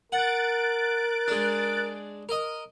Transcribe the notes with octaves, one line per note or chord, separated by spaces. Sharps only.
A#4 F#5 F#6 A6 D7
G#3 D4
A#4 D#5